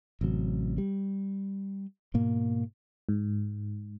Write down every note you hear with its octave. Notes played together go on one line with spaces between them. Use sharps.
A1 C3 F#3
G3
G#2 B2 A#3
G#2